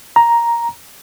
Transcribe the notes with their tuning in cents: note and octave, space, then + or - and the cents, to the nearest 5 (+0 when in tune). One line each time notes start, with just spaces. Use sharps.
A#5 +5